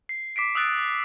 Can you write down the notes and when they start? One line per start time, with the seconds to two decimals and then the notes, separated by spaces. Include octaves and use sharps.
0.09 C7
0.36 D6 B6 C7 D7
0.55 D#6 E6 F#6 A6 D7